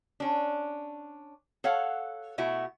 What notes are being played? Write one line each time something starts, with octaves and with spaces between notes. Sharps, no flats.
C#4 D4
A4 C#5 F5 F#5
B2 A3 E4 F#4